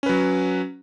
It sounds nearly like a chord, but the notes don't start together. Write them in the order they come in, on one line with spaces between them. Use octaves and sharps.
C#4 B4 F#3